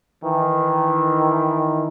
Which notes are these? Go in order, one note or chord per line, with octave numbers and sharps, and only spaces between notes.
D#3 E3